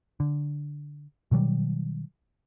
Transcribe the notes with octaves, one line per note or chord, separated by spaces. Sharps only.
D3
B2 D#3 F#3 G3